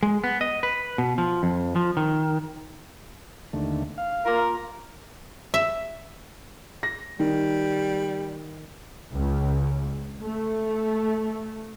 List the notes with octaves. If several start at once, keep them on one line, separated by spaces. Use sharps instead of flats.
G#3
B3
D#5
B4
B2
F3
F2
F3
D#3
D#2 D3 A3
F5
A#3 F4 A#4
E5
A#6
D#3 G3
C#2
A3